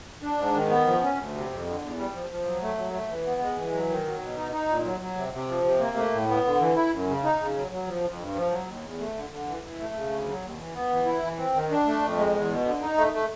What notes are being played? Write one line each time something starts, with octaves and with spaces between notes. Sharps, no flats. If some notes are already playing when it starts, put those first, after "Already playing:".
D4
G#2
D#3
B3
F3
C#4
D2
C3
F2
D3
E2
G3
F3
F3
F#3
A3
F#3
A3
E3
B3
G#3
E3
F#3
D#3
F#3
B2
D#4
D#4
A#2
F#3
F#3
C3
C3
F3
C3
A#3
A3
A2
B3
D3
E3
E4
F#2
C#3
D#4
C#3
F#3
F#3
F3
F2
G2
F3
F#3
D#2
E2
A3
D3
D3
E3
E3
A3
C#3
D2
F#3
D#2
E3
B3
E3
E4
E3
C4
D#3
D4
A3
F2
G#3
E2
B2
D3
D#4
A3
A3